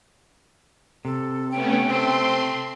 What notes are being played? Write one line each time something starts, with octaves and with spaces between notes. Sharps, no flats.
C3 A4
A3 B3 C#4 G5
A3 C4 C6